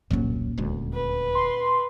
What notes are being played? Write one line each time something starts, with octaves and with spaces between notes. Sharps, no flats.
E1 C2 A#2 F#3 C#4
D#1 D2 G#3
B4
C6